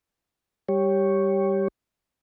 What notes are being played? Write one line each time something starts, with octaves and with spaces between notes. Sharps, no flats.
G3 G4 C#5